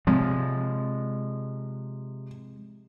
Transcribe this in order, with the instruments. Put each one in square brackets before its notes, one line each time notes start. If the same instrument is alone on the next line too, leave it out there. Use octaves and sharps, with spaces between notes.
[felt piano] C3 [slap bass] F3 G#3